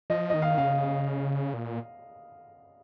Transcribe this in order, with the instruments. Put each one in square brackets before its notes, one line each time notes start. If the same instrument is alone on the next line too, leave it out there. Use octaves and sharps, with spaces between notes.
[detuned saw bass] F3 [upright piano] D#5
[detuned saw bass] D#3 [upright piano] D#5
[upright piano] F5
[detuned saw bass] C#3 [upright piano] F5
[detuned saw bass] A#2